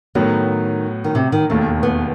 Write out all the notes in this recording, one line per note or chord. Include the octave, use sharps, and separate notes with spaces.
A2 D#3 F#3 B3
D#3
C3
D#3
E1 D#2 D#3 A3
B3